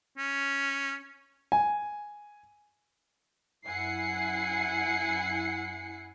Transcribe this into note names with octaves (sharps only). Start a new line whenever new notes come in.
C#4
G#5
F#2 E4 F#5 G#5 C7 C#7